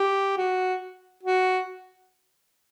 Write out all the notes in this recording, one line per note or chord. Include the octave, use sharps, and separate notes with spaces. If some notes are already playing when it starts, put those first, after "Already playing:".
Already playing: G4
F#4
F#4